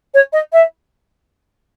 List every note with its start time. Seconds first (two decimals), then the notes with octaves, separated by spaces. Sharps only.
0.14 C#5
0.33 D#5
0.53 E5